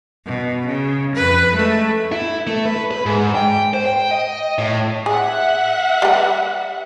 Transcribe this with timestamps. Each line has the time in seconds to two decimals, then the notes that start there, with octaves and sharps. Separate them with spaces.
0.26 B2
0.66 C#3
1.15 F2 B4
1.53 G#3 A3
2.12 E4
2.47 A3
2.65 B4
2.91 B4
3.06 G#2
3.35 G5
3.74 C5
3.86 G5
4.11 D#5
4.58 A2
5.06 G#4 E5 F#5
6.02 G3 B4